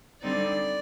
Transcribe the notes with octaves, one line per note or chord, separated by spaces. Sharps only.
D3 G3 C4 D#4 D5